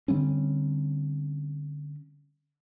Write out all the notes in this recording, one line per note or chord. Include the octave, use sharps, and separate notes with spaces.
D3 G3 C4 C#4